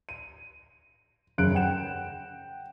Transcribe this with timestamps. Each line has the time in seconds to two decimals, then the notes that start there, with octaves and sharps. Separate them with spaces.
0.09 D#7
1.38 F#2 C#3 F#6 D7
1.55 F#5 G5 E7